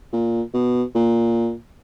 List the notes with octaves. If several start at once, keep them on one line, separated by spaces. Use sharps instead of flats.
A#2
B2
A#2